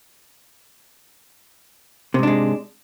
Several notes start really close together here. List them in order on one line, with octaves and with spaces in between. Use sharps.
C3 G#2 D4 G#3